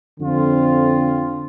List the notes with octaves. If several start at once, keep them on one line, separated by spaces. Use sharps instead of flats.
F2 D3 F3 C4 F4